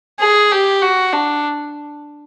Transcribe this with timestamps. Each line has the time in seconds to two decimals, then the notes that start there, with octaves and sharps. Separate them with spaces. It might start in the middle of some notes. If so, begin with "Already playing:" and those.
0.20 G#4
0.52 G4
0.82 F#4
1.13 D4